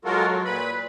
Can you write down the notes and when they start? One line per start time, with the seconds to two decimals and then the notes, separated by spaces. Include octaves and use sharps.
0.05 F#3 G#3 F4 F#4 A4 A#4
0.27 F#3
0.45 A#2 B4 B5